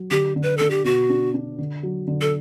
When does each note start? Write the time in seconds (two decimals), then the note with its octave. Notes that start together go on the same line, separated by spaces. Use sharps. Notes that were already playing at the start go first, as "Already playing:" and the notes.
Already playing: F#3
0.11 D3 G4
0.36 D3
0.43 B4
0.57 D3 A4
0.70 G4
0.84 B2 F#4
1.09 D4
1.34 D4
1.58 D3
1.83 F#3
2.07 D3
2.21 A4